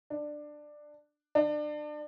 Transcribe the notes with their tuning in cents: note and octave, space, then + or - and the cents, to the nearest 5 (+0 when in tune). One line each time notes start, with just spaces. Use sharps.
D4 +15
D4 +30